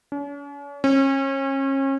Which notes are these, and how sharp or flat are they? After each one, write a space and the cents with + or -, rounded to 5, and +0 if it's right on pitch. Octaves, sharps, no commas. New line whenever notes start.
C#4 +45
C#4 -35